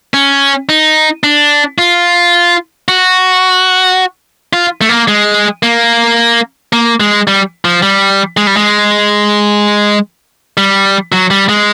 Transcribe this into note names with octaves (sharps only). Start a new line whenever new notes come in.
C#4
D#4
D4
F4
F#4
F4
A3
A#3
G#3
A#3
A#3
G#3
G3
F3
G3
G#3
G3
G#3
G3
F#3
G3
G#3